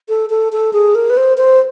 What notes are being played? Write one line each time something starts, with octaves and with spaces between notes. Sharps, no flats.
A4
A4
A4
G#4
A#4
B4
C5
C5